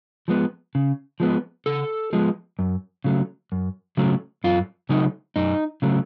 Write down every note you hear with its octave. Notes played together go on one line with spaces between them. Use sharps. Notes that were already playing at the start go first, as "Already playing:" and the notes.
F3 G#3 B3
C#3
F3 G#3 B3
C#3 A4
F3 G#3 B3
F#2
C#3 F#3 A3
F#2
C#3 F#3 A3
F#2 F4
C#3 F#3 A3 D#4
F#2 D#4
C#3 F#3 A3